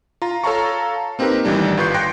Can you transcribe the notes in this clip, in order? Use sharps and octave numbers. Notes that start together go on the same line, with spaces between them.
F4 A#5
A4 C#5 F5 A5 A#5 C#6
A#3 C4 D#4 G4 A#4 B4
A1 D#3 E3 G3 D4
G1 F4 B4 C#6 G6 C7
G5 C6 F#6 A#6 C#7 D7